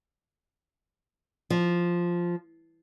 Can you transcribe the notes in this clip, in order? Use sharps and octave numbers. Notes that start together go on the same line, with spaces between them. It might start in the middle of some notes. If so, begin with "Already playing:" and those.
F3